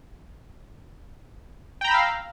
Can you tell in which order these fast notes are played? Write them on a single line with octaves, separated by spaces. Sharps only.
G5 A#5 B5 E6 F5